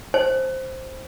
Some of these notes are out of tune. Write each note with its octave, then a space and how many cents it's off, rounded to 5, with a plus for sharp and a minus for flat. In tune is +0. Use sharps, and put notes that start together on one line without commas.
C5 +5